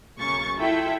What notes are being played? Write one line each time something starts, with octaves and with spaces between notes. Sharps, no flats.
B1 C#3 A#3 C#6 A6
E4 F4 A4 E5 G5